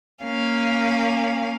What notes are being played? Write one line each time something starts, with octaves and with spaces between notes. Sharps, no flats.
A#3 C#4 F5